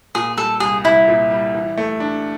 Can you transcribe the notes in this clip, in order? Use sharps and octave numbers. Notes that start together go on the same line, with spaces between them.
A#2 G#4
G3 A4
C2 G#4
C2 E4
A#2
G3
E3
A3
D4